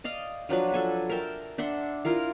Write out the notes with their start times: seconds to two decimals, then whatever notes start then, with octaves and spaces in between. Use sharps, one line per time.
0.04 D5 D#5 F5
0.49 F3 F#3 D4 B4
0.72 A4 G#5 B5
1.09 A#4 E5 G5 A5
1.58 D4 E5 F#5 C6
2.05 E4 F4 A#4 F5